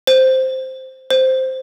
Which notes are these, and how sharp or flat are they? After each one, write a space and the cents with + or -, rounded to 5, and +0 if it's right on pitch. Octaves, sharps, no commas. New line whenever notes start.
C5 +0
C5 +0